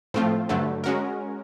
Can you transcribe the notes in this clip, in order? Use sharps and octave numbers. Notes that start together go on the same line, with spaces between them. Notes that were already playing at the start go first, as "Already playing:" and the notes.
A2 F3 A3 C4 F4
G2 D3 F#3 A3
G#3 C#4 F#4 A#4